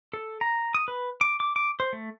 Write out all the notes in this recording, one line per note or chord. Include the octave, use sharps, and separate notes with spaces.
A4
A#5
D#6
B4
D6
D6
D6
C5
A3